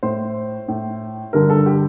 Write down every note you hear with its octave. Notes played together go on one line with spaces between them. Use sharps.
A2 C5
A2
G2 D3 A#4
A4
G4